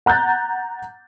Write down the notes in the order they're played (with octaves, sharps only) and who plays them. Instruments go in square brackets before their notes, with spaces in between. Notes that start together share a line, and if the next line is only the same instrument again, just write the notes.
[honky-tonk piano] F#5 A#5 F#6 G6 A6